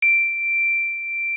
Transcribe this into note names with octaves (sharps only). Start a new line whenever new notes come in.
D7